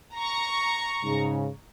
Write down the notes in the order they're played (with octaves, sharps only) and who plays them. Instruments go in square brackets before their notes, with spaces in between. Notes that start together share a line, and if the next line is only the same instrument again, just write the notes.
[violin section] A#5 C#6
[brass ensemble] G#2 C#3